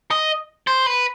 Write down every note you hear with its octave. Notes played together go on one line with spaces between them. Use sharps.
D#5
C5
B4